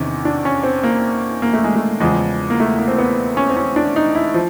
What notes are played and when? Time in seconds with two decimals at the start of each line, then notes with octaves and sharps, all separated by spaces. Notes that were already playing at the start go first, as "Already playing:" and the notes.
Already playing: E2 C3 D#3 C#4
0.25 D4
0.45 C#4
0.64 C4
0.83 A#3
1.42 A#3
1.53 A3
1.64 G#3
1.76 A3
2.00 E2 C#3 F3 G#3
2.50 A#3
2.60 A3
2.79 A#3
2.88 C4
2.98 B3
3.37 C#4
3.49 C4
3.57 C#4
3.76 D4
3.96 D#4
4.15 E4
4.34 F3